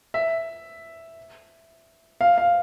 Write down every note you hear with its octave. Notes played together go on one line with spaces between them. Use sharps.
E5
F5
F5